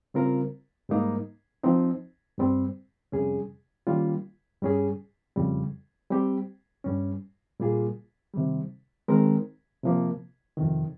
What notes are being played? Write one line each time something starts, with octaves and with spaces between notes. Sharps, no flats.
C#3 G3 C4 F4 A#4
G#2 G3 A#3 D#4
F3 C4 D#4
G2 G3 C4
F2 C3 G3 C#4 G#4
D#3 G3 A#3 C#4 F4
G2 G3 C#4 G#4
F2 C#3 G3
G3 C4 G4
G2 G3 C#4
A#2 G3 A#3 F4 G#4
C3 D#3 G3
D#3 G#3 C4 D#4 A#4
C3 F3 A#3
F2 C3 D#3